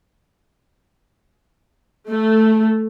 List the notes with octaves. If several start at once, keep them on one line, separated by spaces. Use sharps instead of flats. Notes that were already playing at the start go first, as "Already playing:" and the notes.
A3